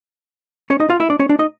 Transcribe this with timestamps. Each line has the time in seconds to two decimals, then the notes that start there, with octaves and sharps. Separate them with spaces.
0.70 C#4 C#5
0.80 D#4 D#5
0.90 F4 F5
1.00 E4 E5
1.10 D4 D5
1.19 C#4 C#5
1.29 D4 D5
1.39 D#4 D#5